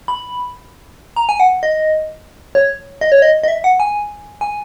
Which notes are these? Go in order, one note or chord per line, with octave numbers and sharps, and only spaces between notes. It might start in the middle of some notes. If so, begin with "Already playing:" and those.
B5
A#5
G#5
F#5
D#5
C#5
D#5
C#5
D#5
D#5
E5
F#5
G#5
G#5